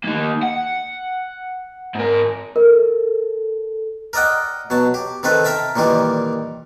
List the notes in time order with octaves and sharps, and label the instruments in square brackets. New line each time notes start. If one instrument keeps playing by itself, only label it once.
[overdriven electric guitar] A#3 D#4
F#5
G#2 A#4
[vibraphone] A4 [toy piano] A#4
[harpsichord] A#4 D5 D#5 F#5 G5
B2 F#3 A5
G4
D#3 C4 A4 B4
A#4 E5 G5 A5
A#2 D#3 E3 G3 G4